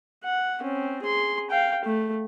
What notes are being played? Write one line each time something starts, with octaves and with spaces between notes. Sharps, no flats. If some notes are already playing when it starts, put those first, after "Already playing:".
F#5
C4 C#4
G#4 C6
F5 G5
A3